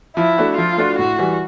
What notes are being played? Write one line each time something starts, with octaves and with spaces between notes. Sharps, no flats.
F3 E4
A3 D4 F#4
F3 F4
A3 D4 F#4
A2 F#4
E3 G3